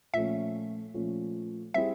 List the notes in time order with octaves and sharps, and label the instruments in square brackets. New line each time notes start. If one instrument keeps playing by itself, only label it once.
[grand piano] A#2 F3 A3 C#4 [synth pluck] E5
[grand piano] A#2 F3 A3 C#4
[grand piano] G3 C4 E4 G#4 [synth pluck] E5